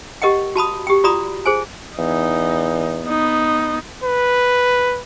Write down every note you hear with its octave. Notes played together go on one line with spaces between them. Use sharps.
G4 A#4 D#5 F#5 G5
F#4 A5 B5 D#6
G4 G5
F4 F#4 D5 A#5 B5 D#6
G#4 C5 G#5
E2 D#4
B3 D#4
B4